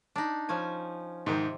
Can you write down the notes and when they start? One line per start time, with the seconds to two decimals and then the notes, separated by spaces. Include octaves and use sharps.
0.16 D4 D#4
0.49 F3 C#4 G#5
1.26 G#2 C3 D#3